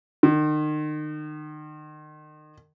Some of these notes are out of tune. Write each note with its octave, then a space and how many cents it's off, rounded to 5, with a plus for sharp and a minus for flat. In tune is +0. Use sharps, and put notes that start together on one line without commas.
D#3 -35